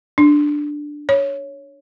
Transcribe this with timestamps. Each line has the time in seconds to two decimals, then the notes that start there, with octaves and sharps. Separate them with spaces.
0.18 D4
1.09 C#5